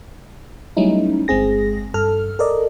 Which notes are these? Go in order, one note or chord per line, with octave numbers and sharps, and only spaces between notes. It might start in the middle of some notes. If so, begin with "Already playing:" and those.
F#3 G3 A3 C#4 D#4 E4
G1 G#3 C4 G#4 A#6
G2 A4 F6
A4 A#4 D5 D#5